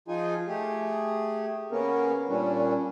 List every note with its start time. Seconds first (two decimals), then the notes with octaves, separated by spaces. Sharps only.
0.08 F3 D#4 F4 G#4 G#5
0.48 A3 G4 G#4
1.72 C#3 A#3 B3 C#4 A#4
2.28 A#2 G3 C#4 D4